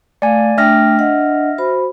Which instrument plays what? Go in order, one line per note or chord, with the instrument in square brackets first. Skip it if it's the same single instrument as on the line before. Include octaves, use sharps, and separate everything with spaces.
[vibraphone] A3 F5 [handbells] D5 G#5
[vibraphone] A3 D4 G5 [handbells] E5 F6 A#6
[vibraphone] D4 D#5 F#5
F#4 C5 B5